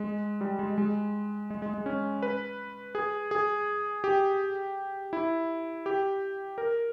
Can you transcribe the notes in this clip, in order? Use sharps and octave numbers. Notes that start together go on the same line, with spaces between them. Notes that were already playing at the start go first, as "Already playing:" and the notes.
Already playing: G#3
G3
G#3
G#3
G#3
G#3
G#3
C#4
B4
G#4
G#4
G4
E4
G4
A#4